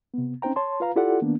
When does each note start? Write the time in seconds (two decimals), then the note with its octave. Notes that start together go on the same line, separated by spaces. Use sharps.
0.14 C3 B3
0.42 C4 C#4 D#4 C5 G5 A#5
0.56 C#5 A5 C6
0.80 F4 B4 F5 A#5
0.96 E4 F4 G4 A4 D5 F#5
1.21 D#3 A#3 B3 D4